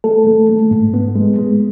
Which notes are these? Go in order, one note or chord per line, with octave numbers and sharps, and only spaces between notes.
A3 A4
A3
A3
G#2
B3
G#3
G#3